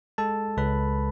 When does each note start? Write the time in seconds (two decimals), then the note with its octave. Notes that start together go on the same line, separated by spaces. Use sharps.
0.18 G#3 A4 A5
0.57 C#2 B4 B5